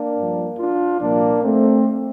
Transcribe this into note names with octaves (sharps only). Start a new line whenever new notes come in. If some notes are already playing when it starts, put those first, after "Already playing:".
Already playing: A#3 D4
G2 F3
D4 F4
C2 A#2 F3 A#3 D4
A3 C4